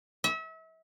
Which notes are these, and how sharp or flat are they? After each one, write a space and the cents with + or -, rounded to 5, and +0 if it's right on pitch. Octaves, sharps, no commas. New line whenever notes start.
E5 -35